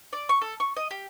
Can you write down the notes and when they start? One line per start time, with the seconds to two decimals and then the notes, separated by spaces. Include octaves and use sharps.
0.13 D5
0.29 C#6
0.41 A4
0.60 C#6
0.77 D#5
0.91 G4